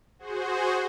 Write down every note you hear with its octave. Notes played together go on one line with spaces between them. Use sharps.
F#4 G#4 C5